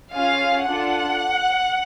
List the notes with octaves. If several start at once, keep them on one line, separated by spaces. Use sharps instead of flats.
C#4 F4 G#4 F5
D4 F4 A4 F#5